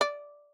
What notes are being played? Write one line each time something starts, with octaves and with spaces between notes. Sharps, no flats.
D5